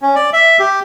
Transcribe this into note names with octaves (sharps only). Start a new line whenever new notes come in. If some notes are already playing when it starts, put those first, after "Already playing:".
C#4
D5
E5
G4